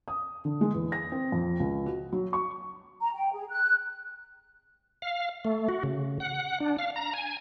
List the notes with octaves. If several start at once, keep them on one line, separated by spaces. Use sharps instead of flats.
D#6
D3
G#3
E2
A#6
C4
F2
C#2
F#4
F#3
C#6
A#5
G5
G#4
F#6
F5
A3
F#4
C#3
F#5
D4
F5
A#5
G#5